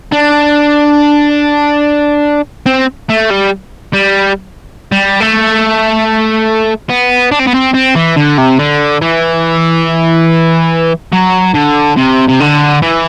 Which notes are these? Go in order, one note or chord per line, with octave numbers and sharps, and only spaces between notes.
D4
C4
A3
G3
G3
G3
A3
B3
D4
C4
B3
C4
C4
E3
D3
C3
D3
E3
F#3
D3
C3
C3
D3
E3